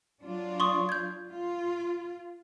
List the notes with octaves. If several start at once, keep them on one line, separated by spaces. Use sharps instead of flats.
F#3 D4 F4
C6 C#6 D#6
G6 G#6
F4